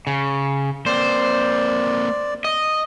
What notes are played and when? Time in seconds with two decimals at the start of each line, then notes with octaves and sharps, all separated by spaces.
0.07 C#3
0.86 A#3 C4 C5 D5
2.45 D#5